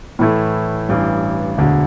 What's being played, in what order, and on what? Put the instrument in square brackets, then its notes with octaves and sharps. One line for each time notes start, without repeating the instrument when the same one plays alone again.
[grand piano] A2 E3 A3 E4
A1 G2 E3
E1 D2 D3